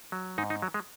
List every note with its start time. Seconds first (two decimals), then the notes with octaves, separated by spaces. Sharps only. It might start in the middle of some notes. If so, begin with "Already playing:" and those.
0.12 F#3
0.38 G#2 D#4
0.50 D#4
0.62 F#3
0.74 G#3